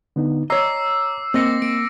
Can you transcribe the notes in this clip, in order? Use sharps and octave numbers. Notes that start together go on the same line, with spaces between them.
D3 B3 D#4
C#5 D#5 A#5 D6 E6 C7
A#3 C4 D#5 D6 A#6 C#7
A#3 D7